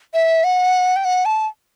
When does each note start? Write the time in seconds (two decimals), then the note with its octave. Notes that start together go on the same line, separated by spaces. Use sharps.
0.14 E5
0.44 F#5
0.96 G5
1.05 F#5
1.25 A5